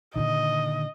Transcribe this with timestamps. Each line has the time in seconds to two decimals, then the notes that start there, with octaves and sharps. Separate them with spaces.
0.16 A#2 D3 D#3 D#5